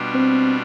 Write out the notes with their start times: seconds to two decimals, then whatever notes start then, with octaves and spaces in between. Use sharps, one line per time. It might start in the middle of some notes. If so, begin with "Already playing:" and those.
Already playing: B2 G3 D4 F4
0.15 C4